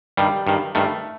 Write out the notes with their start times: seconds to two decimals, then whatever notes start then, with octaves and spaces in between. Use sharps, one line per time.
0.17 G2 D#3 G3
0.47 G2 D#3
0.75 G2 D#3 A3